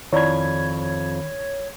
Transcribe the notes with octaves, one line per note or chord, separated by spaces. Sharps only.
F2 D#3 E4 C#5 D5 B5 G#6